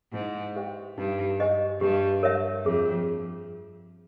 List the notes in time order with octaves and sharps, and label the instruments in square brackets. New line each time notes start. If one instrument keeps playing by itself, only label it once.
[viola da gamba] G#2 [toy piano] E4
[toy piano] G4 C5 E5 G5
[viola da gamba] G2 [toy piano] D#4
[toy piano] G4 C5 D#5 G#5
[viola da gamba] G2 [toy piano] G4
[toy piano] A#4 C#5 E5
[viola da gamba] F2 [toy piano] G#4